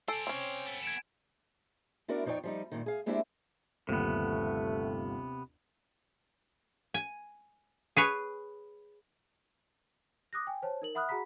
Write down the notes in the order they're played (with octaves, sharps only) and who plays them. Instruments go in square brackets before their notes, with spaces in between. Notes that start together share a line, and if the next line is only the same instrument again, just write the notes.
[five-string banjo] A4 [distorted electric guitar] C5 D5 [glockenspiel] G#5 D7
[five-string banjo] C4 C#4
[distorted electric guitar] B3 A4
[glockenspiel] G#6 D7 E7
[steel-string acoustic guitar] B3 D4 E4 F#4 A#4 D5
F2 F3 D#4 C#5 D5 G5
F3 G3 D#4
G2 A#2 D#3
G#4 F5
G#3 A#3 C4 D4 E4 G4
[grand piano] G1 D#2 [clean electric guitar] C3 B3 [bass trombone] A3
[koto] G#5
G#4 B4 C#5
[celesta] D6 D#6 F#6 A#6
G5 G#5
C5 C#5 A5
D#4 A#4 F#7
E5 F#5 B5 D#6 F6 F#6
F#4 G#4 F#5 A#5 B5 B6